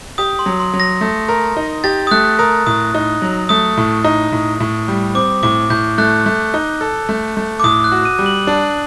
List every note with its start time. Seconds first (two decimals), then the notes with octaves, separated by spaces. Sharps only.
0.18 G4 D#6
0.39 C6
0.46 F#3
0.60 C6
0.73 F#3
0.80 A#6
1.01 A3
1.29 A#4
1.57 D#4
1.84 G4 A6
2.07 D#6
2.11 A3 F#6
2.39 A#4 D#6
2.66 A2 D#6
2.94 D#4
3.22 F#3
3.49 A3 D#6
3.77 A2
4.04 D#4
4.32 A2
4.60 A2
4.88 G3
5.15 C4 D6
5.43 A2 D6
5.70 A2 G6
5.98 A3 F#6
6.26 A3
6.54 D#4
6.81 A4
7.09 A3
7.37 A3
7.60 D6
7.64 A2 D#6
7.84 F#6
7.92 F#4
8.05 D#7
8.19 G3
8.26 F#7
8.47 D4